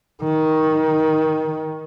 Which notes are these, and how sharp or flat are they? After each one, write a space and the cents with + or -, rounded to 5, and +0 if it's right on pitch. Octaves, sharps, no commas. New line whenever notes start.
D#3 +15